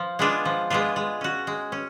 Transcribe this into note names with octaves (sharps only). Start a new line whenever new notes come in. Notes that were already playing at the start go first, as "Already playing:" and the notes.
Already playing: F3
G#3 B3 D4 F4
F3
G#3 B3 D4 F4
G#3
C#4 F#4
G#3
C#4